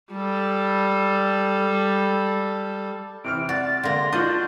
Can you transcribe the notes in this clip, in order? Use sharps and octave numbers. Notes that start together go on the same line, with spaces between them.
G3 A4
C3 E3 F6 D7
F#4 D5 A6
D3 A#3 C6 A#6
D4 F4 F#4 D#5 G6